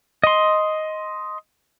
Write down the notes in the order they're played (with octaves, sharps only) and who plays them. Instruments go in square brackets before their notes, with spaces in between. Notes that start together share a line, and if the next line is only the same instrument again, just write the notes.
[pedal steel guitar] D#5 C6